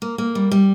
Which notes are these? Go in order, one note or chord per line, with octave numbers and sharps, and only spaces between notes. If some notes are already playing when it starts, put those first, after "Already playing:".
A#3
A#3
G3
G3